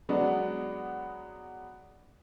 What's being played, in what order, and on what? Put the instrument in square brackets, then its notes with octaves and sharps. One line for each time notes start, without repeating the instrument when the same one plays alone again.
[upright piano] F#3 G#3 B3 D4 F#4